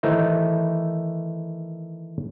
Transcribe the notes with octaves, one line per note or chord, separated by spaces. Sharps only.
D#3 E3 A3 D#4 C5